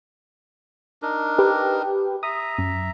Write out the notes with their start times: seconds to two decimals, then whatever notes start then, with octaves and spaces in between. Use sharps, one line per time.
1.02 D4 D#4 A#4
1.38 G4 B4
2.23 E5 A#5 D#6
2.58 F#2